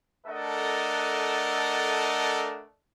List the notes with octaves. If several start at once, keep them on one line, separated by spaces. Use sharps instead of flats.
A3 D4 A4 A#4 D#5 F#5